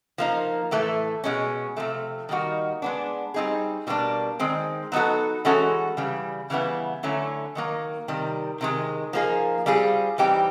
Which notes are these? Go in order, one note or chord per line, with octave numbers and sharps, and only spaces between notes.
F3 A#3 D#4
A2 E3 A3
B2 G#3 C#4
C3 F3 A3
D#3 G3 A#3 D#4 F#4
G#3 B3 D4
G3 C4 D#4 G#4
B2 G3 A#3 D4
D#3 G#3 C4
F#3 B3 D#4 F#4 A4
E3 G#3 C#4 F#4 A4
C#3 E3 G3
C#3 E3 G3 B3 E4
D3 F#3 A3 C#4 E4
D#3 F#3 A#3
C3 D#3 G3
C3 D#3 G#3
F3 A#3 D#4 G#4
G3 C4 F4 G#4
E3 G3 C4 D#4 G4